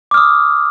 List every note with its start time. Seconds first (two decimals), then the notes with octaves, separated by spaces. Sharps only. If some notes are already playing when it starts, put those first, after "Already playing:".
0.11 D6
0.14 F6
0.17 D#6